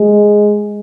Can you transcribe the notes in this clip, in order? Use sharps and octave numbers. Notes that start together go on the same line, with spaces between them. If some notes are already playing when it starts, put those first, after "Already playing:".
Already playing: G#3